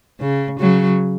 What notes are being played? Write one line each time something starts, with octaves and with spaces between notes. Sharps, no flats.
C#3
C#3 F#3